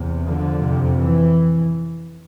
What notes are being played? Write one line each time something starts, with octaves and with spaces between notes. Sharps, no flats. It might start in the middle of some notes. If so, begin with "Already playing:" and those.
Already playing: E2 C3
D3 F3
F2 C3
E3